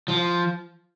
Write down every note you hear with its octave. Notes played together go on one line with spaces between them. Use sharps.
F3